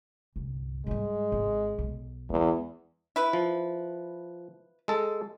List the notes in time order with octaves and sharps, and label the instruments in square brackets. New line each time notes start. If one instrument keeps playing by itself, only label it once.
[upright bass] G1 C2
[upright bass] G#2 G3 [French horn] G#3
[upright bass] G#1
B1
[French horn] E2 [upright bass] G#3
[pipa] E4 B4
[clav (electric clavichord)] F3
G#3 A4